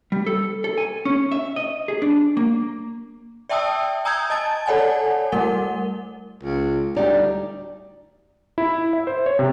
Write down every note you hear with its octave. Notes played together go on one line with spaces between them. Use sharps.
G3
A4
A4
G#5
C#4
E5
D#5
G#4
D4
A#3
D5 E5 G5 A5 D#6 E6
G#5 A#5 D#6 E6 G6 G#6
D#5 A5 G#6 A6
A4 C#5 D5 F#5 G#5 A5
G3 A3 A#4 F#5 G7
C#2
D2 G3 D#4 D5
E4
E5
C5
C#5
C3